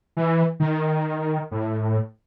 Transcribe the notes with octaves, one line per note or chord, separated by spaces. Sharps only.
E3
D#3
A2